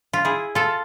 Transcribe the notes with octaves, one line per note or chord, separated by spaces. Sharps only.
F4
E4 G#4
F4 A4